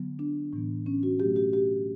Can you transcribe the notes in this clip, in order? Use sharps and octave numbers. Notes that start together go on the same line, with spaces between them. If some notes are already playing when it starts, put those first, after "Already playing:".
Already playing: D3 F#3 B3
D4
A2 E3 G3 B3
C#4
F#4
B2 F#3 A3 G4
G4
G4